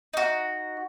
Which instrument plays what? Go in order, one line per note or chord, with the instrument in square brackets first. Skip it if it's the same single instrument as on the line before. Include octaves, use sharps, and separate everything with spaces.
[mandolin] D#4 F#4